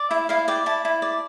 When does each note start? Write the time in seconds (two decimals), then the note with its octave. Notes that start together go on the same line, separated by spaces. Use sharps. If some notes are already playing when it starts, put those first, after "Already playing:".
Already playing: D5
0.11 E4 E5
0.29 E4 F5
0.48 D5 G5
0.66 E4 A5
0.85 E4
1.02 D5